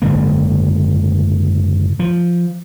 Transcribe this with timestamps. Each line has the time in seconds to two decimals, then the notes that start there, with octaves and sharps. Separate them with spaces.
0.02 F#1 G#2 D3 A#3
1.99 F3